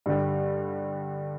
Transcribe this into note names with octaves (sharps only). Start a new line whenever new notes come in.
G2 D3 G3